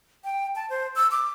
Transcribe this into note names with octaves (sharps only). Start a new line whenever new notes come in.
G5
A5
C5
E6
D6